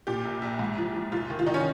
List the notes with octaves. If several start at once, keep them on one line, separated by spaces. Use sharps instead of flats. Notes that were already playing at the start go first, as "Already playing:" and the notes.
A#2 G4
A#1
A#1
G#2
F3
F3
F1 F4
D#3
F4
D#3 D#4
C#4